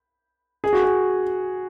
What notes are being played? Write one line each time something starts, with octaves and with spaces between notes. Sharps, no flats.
G#4
F#4
G#4